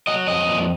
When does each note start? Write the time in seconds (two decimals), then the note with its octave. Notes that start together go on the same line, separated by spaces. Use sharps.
0.07 F#3 D#5
0.27 F2 D#5
0.48 A#2